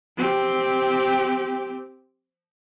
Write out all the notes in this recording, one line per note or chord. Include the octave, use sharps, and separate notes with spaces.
C4 G4